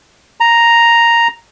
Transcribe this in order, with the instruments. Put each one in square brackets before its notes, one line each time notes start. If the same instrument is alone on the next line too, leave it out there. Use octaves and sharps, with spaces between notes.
[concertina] A#5